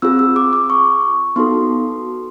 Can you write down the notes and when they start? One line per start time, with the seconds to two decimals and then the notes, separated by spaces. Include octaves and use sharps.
0.02 C4 F4 G#4 E6
0.19 E6
0.36 D6
0.53 D6
0.70 C#6
1.36 B3 D#4 F#4 A4 C6